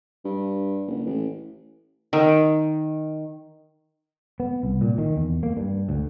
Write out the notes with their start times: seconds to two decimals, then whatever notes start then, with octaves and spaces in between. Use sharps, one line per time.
0.25 G2
0.87 F#1
1.06 A1
2.13 D#3
4.40 B3
4.63 C2
4.81 A#2
4.98 D#3
5.16 E2
5.43 A#3
5.57 G2
5.89 D2